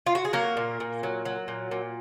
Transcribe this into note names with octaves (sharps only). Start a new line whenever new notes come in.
F4
F#4
G#4
F#3 A#3 A#4
A#2
A#2
F#3
F#3
A#2
A#2